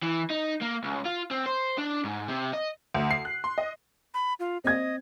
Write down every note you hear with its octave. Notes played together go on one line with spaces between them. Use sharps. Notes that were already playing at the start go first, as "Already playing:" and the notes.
E3
D#4
A#3
C#2
F4
C4
C5
D4
G#2
C3
D#5
D2
C7
F#6
C6
D#5
B5
F4
C4 D#5 G#6